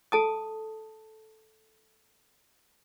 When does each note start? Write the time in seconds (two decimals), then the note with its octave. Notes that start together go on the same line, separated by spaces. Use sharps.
0.12 A4 A5 D#6